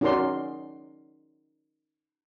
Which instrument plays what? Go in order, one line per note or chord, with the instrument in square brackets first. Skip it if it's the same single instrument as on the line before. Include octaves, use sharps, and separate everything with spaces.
[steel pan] C#4 D#4 F#4 A#4 D5 C6